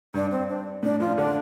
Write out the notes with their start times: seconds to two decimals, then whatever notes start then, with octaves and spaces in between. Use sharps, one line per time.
0.14 G2 D4
0.31 C4
0.49 D4
0.83 A2 D4
1.00 F3 F4
1.18 D3 D4